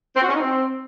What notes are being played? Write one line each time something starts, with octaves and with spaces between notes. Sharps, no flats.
C4
F#4
C#4
D#4
C4